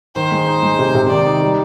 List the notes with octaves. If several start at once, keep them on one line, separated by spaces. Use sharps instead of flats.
D#3 C5
G#3
D#4
G#3
C3
C3
D#3 D5
D#4
G3